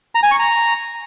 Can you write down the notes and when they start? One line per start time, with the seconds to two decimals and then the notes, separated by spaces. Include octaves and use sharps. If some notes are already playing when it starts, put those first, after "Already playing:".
0.15 A#5
0.23 G#5
0.31 C#6
0.39 A#5